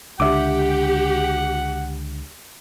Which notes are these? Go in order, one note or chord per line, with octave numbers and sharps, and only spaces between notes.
C#2 D3 G4 E5 F#5 D6